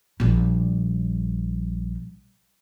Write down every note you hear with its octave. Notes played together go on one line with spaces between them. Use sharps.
A#1 G3